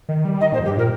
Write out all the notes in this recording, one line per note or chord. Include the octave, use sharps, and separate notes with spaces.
D#3
G3
D#3 D#5
A#2 C5
F2
G2 G4
A#2 A#4